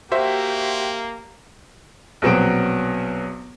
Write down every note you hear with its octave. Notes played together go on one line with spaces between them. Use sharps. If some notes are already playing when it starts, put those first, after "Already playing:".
A#3 F#4 G4 C5 E5
A#1 B2 F#3 B3 C4 D7